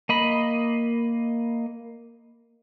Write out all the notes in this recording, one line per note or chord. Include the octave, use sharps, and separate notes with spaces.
A#3 D#5 B5